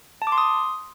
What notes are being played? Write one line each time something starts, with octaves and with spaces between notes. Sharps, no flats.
A5
D6
C6
D#6